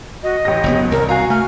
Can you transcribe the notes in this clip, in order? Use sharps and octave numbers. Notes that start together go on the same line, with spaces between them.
F#4 D#5
A1 G4 A#6
F#1 F#3 B3
C2 A#4
F#4 F5 G#5 A#5
A3 G#5 F6